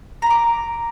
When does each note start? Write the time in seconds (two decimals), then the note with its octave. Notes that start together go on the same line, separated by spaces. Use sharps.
0.22 A#5
0.26 B5
0.30 D6